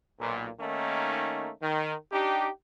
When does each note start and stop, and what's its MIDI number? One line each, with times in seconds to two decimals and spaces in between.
0.19 0.48 35
0.19 0.48 46
0.60 1.50 51
0.60 1.50 57
0.60 1.50 58
0.60 1.50 61
0.60 1.50 63
1.62 1.93 51
2.12 2.48 62
2.12 2.48 63
2.12 2.48 67